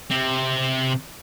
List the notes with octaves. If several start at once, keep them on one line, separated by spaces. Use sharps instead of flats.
C3 C4